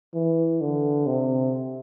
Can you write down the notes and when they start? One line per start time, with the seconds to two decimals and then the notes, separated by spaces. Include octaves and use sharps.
0.14 E3
0.61 D3
1.07 C3